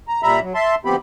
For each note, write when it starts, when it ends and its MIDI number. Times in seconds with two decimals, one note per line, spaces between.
0.08 0.22 82
0.23 0.40 46
0.23 0.40 55
0.23 0.40 76
0.23 0.40 82
0.23 0.40 83
0.42 0.53 54
0.54 0.75 76
0.54 0.75 81
0.54 0.75 84
0.85 0.96 38
0.85 0.96 53
0.85 0.96 59
0.85 0.96 60
0.85 0.96 67
0.85 0.96 83